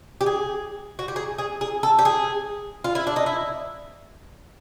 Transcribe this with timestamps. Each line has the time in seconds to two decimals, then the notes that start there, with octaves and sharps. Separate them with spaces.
0.21 G4
0.26 G#4
0.99 F#4
1.08 G4
1.16 G#4
1.38 G#4
1.61 G#4
1.83 A4
1.99 G4
2.05 G#4
2.84 F4
2.95 E4
3.07 D4
3.16 D#4
3.26 E4